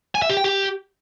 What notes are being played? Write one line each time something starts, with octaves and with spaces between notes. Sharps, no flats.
G#5
E5
G4
G5
G4